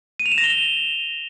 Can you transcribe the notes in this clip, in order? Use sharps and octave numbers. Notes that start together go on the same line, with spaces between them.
D#7
F7
E7
A#6
G7